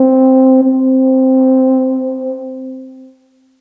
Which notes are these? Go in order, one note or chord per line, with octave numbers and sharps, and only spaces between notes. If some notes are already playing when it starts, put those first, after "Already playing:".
Already playing: C4
C4